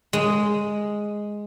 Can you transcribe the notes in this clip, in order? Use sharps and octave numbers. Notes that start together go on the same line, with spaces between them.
G#3